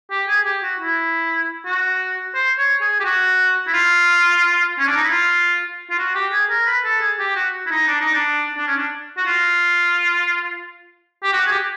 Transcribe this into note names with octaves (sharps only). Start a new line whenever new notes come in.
G4
G#4
G4
F#4
E4
F#4
C5
C#5
G#4
G4
F#4
E4
F4
C#4
D4
D#4
E4
F4
F4
F#4
G4
G#4
A#4
B4
A4
G#4
G4
F#4
E4
D#4
D4
D#4
D4
D4
C#4
D4
F#4
F4
G4
F#4
G#4
G4